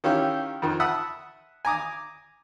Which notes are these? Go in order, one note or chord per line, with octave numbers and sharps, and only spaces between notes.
D#3 C#4 E4 F4 G4
F2 D#3
E5 F#5 A5 B5 D#6 E6
G#5 A#5 D6 D#6